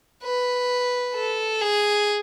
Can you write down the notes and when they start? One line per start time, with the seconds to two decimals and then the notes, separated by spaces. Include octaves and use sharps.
0.23 B4
1.15 A4
1.61 G#4